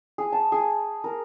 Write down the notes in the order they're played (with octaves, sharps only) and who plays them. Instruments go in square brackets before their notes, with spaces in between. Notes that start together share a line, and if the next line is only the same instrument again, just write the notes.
[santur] G#4
A5
G#4
A#4